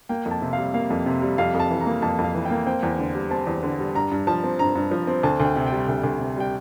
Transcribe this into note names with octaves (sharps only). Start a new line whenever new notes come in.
A#3 G5
F2
A5
C3
F5
G3
A#3 F5
F2
C3
G3
F2 F5
F2
A5
E3
A#5
A#3
F2 A5
F2
F5
E3
G5
A#3
C4 G5
E2
D3
G3
C4 A5
E2
D3
G3
G2 A#5
G2
F3 A5
C4
G2 A#5
G2
F3
C4
D2 A5
D2
G5
C3
G5
G3
D2
D2
C3
G3 G5